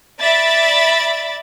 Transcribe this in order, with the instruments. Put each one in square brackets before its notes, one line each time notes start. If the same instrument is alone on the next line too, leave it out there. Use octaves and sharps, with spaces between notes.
[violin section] D5 E5 B5 A6